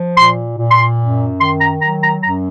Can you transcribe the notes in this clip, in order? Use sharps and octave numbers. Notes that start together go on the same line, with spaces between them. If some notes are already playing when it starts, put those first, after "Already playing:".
Already playing: F3
A#2 C6
A#2
C6
F#2
D#3 C6
A#5
F#3 A#5
A#5
F#2 A#5